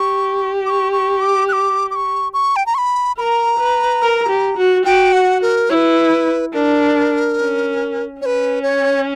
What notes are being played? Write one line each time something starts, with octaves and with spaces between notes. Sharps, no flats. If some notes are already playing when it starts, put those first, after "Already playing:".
Already playing: G4 C#6
D6
C#6
C#6
D6
F#6
D6
D6
C#6
C#6
G5
A#5
C#6
B5
A#4 A#5 B5
B4
A#4
G4
F#4
F#4 G5
F#5
A#4
E4 B4 C#5
D4 A#4
C#4
C#4 B4 C#5
C#5